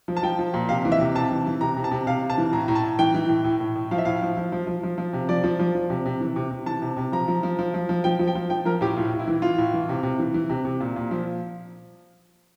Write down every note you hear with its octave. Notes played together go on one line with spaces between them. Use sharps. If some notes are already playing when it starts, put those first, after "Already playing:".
F3
A5
F3 G5
F3
A#2
C3 F5
E3
E5
C3
C3 A5
E3
E3
C3 A#5
C3
A5
C3
C3 F5
C3
A5
E3
A2 A#5
A2 A#5
A5
A2
E3 G5
E3
A2
A2
A2
A2
F3 F5
E5
A2 F5
F3
F3
F3
F3
F3
F3
C3
F3 D5
F3
F3
F3
C3
C3
E3
C3
C3
E3 A5
C3
C3
F3 A#5
F3
F3
F3
F3
F3
F3 G5
F3
G5
F3
F3 G5
F3 A#4
A2 G4
A2 F4
A2
E4
E3
E3 F4
A2
E3
C3
C3
E3
E3
C3
C3
A#2
A#2
F3